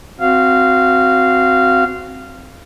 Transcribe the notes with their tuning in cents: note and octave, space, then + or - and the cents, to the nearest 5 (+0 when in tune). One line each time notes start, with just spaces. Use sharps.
C4 +0 F#4 +0 F5 -15